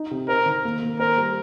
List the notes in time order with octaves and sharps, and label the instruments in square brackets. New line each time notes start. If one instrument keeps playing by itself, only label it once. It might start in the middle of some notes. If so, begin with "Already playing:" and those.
Already playing: [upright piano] D#4
C3
[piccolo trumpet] A#4 [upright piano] C5
[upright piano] D#3
A#3
A#3
[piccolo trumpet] A#4 [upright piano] C5
[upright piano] G3